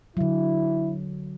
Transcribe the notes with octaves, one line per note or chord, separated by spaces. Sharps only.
D3 F#3 E4